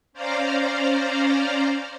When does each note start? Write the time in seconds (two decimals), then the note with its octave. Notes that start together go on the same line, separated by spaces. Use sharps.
0.13 C#4 C5 D5 F5 A#5